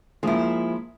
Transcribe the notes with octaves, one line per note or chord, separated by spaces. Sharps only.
F3 G#3 A#3 E4